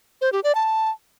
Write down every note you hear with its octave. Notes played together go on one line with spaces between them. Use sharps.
C5
G4
D5
A5